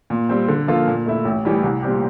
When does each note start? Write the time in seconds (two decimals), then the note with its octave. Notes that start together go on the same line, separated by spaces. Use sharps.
0.10 A#2
0.29 G3 C4
0.48 D3
0.68 F3 A#3 F4 A4
0.88 A#2
1.06 A3 E4
1.25 A1
1.45 A2 E3 G3
1.64 C2
1.82 A#2 G3 C4 G4